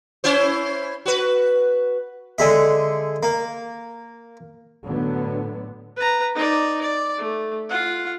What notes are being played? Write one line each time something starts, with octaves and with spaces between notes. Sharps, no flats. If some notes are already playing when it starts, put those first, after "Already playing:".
C#4 E4 C5
F#4 B4
D3 G#3 E5
A#3
A2 D3 F#3 B3
B4 A#5
D#4 D5
D5
A3
F4 F#5